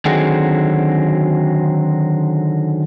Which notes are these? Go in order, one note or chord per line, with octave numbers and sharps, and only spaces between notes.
D3 D#3 F#3 C4 F#4 G#4